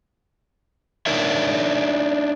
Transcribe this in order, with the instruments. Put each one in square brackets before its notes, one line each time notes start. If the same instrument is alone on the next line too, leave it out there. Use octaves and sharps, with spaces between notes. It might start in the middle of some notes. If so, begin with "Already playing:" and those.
[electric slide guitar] D4 D#4 A#4 C#5 E5